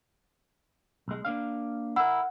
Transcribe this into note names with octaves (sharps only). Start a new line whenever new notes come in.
B1 G#3
A#3 D4 F5
E4 A#4 F#5